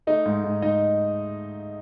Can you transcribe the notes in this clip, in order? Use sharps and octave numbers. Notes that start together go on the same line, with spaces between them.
A3 D#4 D#5
G#2
G#2
G#2 D#4 D#5